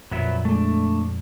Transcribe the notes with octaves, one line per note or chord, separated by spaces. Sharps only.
F2 A#2 F#3 B3 E5
G#3 A3 D4